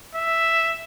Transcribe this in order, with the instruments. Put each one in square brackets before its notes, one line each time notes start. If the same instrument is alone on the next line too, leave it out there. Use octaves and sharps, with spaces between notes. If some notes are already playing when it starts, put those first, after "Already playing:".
[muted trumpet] E5